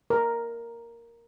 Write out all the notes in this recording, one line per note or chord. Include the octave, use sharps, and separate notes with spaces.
A#4